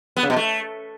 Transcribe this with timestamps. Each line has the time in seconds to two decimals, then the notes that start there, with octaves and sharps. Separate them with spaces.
0.17 B3
0.23 C#3
0.30 B2
0.36 A3